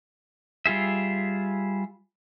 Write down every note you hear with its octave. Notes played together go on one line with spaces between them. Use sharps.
G3 F4 G#4 E5